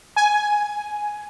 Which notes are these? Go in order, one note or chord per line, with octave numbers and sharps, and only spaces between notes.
G#5